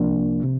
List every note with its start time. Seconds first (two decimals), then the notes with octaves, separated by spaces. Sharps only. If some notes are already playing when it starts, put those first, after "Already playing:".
Already playing: C2 C3 F3 A#3 D4
0.44 C3